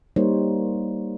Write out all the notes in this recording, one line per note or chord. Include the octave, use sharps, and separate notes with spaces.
G3 A#3 D#4 C5 C#5